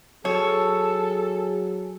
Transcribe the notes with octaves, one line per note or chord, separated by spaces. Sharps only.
F#3 G#4 A4 C#5